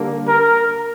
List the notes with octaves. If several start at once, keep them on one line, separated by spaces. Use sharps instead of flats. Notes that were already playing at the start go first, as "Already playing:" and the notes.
Already playing: D3 G3 A#3
A#4